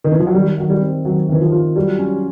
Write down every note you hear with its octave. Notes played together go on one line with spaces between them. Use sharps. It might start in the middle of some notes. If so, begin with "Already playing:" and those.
D#3
E3
F3
F#3
D#3 G3
D#3 F#3
G3
C4
D#3 F#3
D#3 E3
F3
F4
F#3 G3
C#4